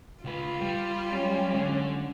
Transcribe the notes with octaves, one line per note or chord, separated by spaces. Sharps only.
C#2 F4 B4
G3
F#3 G#3 C#4
D3